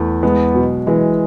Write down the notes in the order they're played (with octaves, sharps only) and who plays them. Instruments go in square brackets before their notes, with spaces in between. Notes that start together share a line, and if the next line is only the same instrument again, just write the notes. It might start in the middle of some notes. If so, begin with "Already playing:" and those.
Already playing: [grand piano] E2 A3
[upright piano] G#3 [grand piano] B3
[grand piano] B2 [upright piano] F#3
[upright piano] E3 [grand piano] G#3